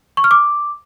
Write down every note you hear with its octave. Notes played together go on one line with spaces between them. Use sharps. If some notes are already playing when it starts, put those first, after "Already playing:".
C#6
F6
D6